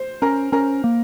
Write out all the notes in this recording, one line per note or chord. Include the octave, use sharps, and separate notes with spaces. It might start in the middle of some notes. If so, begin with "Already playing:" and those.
Already playing: C5
C#4 A#4
C#4 A#4
A#3